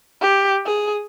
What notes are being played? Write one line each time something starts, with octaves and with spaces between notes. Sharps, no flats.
G4
G#4